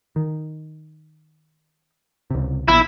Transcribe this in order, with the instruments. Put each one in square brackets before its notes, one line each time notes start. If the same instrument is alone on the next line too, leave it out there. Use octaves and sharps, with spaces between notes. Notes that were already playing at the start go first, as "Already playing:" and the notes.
[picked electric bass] D#3
C#2 C3
[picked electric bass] A#1 B2 [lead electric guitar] E4